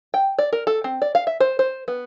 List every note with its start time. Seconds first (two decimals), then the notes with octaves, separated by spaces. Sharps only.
0.14 G5
0.39 D5
0.53 A#4
0.67 A4
0.84 C4
1.02 D5
1.15 F5
1.27 E5
1.40 C5
1.59 C5
1.88 B3